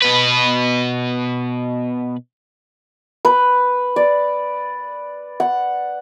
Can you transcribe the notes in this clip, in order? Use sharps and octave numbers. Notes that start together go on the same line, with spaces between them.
B2 B4
B4
D5
F#5